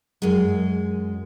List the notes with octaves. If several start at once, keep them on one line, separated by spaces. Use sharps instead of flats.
F#2 G#3